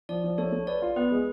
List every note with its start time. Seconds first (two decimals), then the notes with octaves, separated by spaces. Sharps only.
0.09 F3 D5
0.24 F3
0.38 A3 C#5
0.52 A3
0.67 B4 D5
0.82 F4
0.96 B3 B4
1.12 G#3